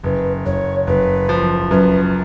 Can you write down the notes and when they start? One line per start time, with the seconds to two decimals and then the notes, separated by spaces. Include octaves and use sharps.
0.03 F#1 B4
0.46 F#1 C#5
0.87 F#1 B4
1.29 F3
1.71 F#2 B4